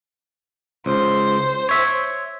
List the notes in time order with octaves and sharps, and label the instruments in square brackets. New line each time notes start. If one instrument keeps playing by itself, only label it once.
[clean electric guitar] C#2 [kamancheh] C5
[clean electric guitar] C#5 E5